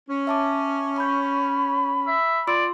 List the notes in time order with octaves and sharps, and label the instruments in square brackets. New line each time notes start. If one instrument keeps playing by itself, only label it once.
[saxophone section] C#4
[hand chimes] E5 A5 D6
[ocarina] B5 [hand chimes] C#6 G6
[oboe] E5
[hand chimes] F4 C6 E6 [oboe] D5